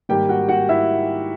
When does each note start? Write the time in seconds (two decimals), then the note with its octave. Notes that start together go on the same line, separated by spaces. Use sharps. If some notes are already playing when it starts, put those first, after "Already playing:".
0.09 G#2 D#3 G3 A#3 G4 G5
0.29 F#4 F#5
0.48 F#4 F#5
0.69 E4 E5